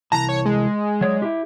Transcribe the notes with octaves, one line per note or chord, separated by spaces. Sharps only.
C2 E3 A5 A#5
C#5
G#3
F#3 C#5 D5
E4 G4